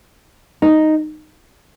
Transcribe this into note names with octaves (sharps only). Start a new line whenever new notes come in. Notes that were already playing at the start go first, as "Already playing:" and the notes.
D#4